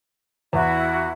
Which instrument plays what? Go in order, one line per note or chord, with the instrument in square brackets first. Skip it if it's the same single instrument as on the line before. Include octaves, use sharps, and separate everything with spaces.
[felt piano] E2 [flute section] E4 F#4 E5